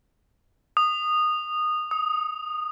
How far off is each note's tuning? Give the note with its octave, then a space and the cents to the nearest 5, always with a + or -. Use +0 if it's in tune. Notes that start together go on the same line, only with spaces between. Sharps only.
D#6 -20
D#6 +20